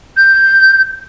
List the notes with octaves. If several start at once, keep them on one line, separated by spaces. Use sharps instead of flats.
G6